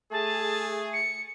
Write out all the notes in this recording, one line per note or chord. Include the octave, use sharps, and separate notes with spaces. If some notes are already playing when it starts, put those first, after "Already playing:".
A3 G#4 A5
C#7